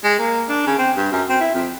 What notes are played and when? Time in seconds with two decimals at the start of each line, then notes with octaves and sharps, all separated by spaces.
0.04 G#3
0.19 A#3
0.49 D4
0.67 C#3
0.79 C4
0.96 G2
1.12 F#2
1.29 C4
1.41 E4
1.54 F2